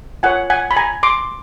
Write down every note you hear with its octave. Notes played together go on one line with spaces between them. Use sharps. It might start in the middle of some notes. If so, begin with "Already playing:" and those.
F4 A#4 C#5 F#5 G#5
F#5 G#5
B5
G#5 A#5
C6 D6